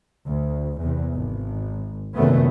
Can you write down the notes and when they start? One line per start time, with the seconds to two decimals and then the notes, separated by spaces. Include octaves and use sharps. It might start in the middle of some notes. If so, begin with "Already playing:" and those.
0.26 D2
0.79 E2 C3
1.15 G#1
2.16 F1 F#2 A#2 D#3 A3 B3